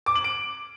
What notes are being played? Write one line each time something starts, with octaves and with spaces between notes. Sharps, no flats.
D6
F#7
D7